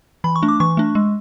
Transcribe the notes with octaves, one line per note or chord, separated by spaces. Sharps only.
E3 B5
C#6
A3 D4
D6
E3 C#6
A3 D4
G#3